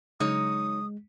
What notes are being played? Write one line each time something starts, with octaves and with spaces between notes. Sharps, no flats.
C#3 F#3 G#3 D#4 C#5 D#6